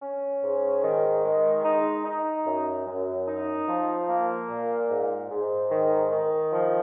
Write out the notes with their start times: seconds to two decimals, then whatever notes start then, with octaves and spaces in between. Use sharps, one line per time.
0.02 C#4
0.43 G#2
0.83 D#3
1.23 G#3
1.65 D#4
2.05 D#4
2.46 F#2
2.87 F#2
3.27 D#4
3.68 F3
4.08 A#3
4.49 A#2
4.90 G#2
5.30 G#2
5.71 D#3
6.12 D#3
6.52 F3